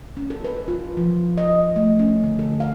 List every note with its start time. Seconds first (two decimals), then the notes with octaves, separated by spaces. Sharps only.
0.17 C#4
0.30 A4
0.44 B4
0.68 F4
0.97 F3
1.38 D#5
1.76 A3
1.99 C#4
2.24 D3
2.39 A4
2.60 F5